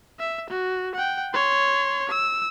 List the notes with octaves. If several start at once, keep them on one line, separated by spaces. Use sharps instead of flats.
E5
F#4
F#5 G5
C#5 C6
E6